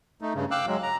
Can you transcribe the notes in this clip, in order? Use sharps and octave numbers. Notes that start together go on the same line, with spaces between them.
A3 D#4
G2 C#3
F5 G5 D6 E6 F#6
F#3 G#3
A#5